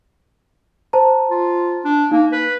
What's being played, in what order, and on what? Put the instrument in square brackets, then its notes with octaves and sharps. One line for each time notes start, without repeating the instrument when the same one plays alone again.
[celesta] C5 A5 A#5
[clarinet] F4
D4
[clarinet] A#3 [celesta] D#4
[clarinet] B4